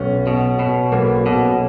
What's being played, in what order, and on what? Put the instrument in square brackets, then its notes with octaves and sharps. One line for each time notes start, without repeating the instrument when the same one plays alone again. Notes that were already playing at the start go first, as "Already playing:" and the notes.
Already playing: [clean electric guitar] B1 [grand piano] C#4
[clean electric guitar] B2
B2
[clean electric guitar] B1 [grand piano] A#3
[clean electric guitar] B2